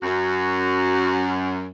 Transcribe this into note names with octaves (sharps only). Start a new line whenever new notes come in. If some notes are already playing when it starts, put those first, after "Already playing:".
F#2 F#4